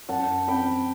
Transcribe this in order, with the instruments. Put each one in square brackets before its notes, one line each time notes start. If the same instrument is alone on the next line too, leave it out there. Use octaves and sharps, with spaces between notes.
[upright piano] F#2 [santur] F#5 A5
[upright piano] C4 [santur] G5 B5